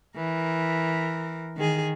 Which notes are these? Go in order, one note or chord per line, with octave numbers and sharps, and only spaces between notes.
E3 A#4
D#3 G#4